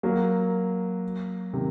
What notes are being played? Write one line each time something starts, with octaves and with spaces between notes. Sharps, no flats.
F#3 A#3
C3 D#3